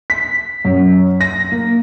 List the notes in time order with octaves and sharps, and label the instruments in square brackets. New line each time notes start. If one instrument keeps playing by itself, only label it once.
[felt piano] B6
F#2
A#6
A#3